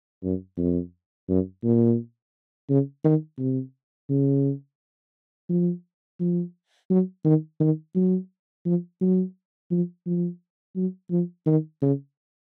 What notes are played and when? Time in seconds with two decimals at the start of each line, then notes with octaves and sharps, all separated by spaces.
0.24 F#2
0.58 F2
1.29 F#2
1.64 A#2
2.69 C#3
3.05 D#3
3.38 C3
4.09 C#3
5.49 F3
6.20 F3
6.90 F#3
7.25 D#3
7.60 D#3
7.95 F#3
8.66 F3
9.01 F#3
9.71 F3
10.06 F3
10.76 F#3
11.11 F3
11.46 D#3
11.82 C#3